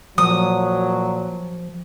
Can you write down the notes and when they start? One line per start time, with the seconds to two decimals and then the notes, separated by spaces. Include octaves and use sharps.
0.18 A#2 F3 F#3 D#6